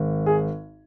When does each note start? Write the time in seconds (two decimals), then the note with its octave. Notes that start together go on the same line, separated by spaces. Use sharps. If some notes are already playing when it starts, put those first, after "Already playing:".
Already playing: G#1
0.26 G#4